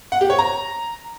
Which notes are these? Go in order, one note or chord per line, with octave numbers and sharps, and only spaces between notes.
F#5
G4
C#5
A#5